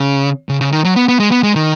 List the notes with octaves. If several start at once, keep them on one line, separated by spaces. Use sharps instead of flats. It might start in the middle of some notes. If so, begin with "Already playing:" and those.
Already playing: C#3
C#3
C#3
D#3
F#3
B3
B3
G#3
B3
G#3
D#3